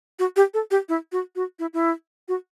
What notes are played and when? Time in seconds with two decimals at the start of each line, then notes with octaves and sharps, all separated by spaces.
0.19 F#4
0.36 G4
0.54 A4
0.71 G4
0.89 E4
1.12 F#4
1.36 F#4
1.59 E4
1.74 E4
2.28 F#4